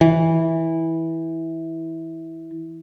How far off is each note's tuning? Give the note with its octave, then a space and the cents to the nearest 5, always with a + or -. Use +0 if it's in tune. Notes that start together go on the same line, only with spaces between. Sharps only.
E3 -15